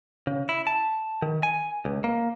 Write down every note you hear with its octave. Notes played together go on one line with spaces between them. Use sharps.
C#3
E4
A5
D#3
G#5
C#2
A#3